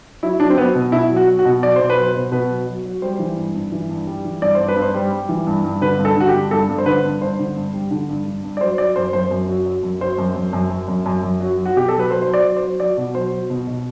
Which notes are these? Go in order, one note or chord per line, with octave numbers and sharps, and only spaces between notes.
F#3 E4
F#3 D4
C4
F#3 B3
B2
B2 E4
F#3
F#4
F#3
F#4
B2
F#3 D5
B2 C5
B4
F#3
C5
B2
B2 B4
F#3
F#3
F#3
G3 C5
E3
G2
G2
E3
G2
G3
E3
G2 D5
G2 C5
B4
G2
C5
G3
G3
E3
G2
G2
D3 B4
G2
A4
D3 F#4
G4
G2
G2 A4
G2
C5
D3 B4
G2
G2 C5
D3
G2
G3
D3
G2
G2
G2
D5
F#3 C5
F#3 D5
F#2 C5
F#2 C5
F#2
F#3
F#3
F#2
F#3 C5
F#2
F#2
F#2
F#2
F#2
F#2
F#2
F#3
F#3
F#4
B2 G4
F#3 A4
B4
F#3 C5
C5
F#3
D5
F#3
C5
F#3
F#3 D5
B2
F#3 C5
F#3
B2
B2